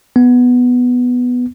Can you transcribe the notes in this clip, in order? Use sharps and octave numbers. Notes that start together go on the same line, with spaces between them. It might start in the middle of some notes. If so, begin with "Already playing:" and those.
B3